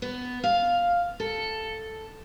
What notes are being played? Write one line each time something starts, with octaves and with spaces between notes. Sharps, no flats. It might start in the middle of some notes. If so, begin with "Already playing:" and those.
B3
F5
A4